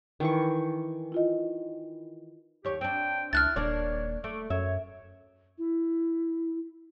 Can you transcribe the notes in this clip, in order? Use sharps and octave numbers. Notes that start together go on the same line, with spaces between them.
D#3 E3 C#6
E4 F4 D#5
D#2 G4 C#5
C4 D4 G5
C#2 D4 E4 F6 F#6 A6
D#1 A#3 D4 C#5 D5
A3 D6
F#2 C#5 E5
E4